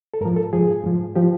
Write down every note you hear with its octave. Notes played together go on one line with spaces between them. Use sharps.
A4
G#2 F3 A#4
A4
G#2 F3 G#4
G#2 F3
F3 G4